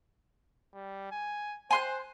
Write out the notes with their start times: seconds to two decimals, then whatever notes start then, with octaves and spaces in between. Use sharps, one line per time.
0.74 G3
1.12 G#5
1.71 C5 G#5 C6 F#6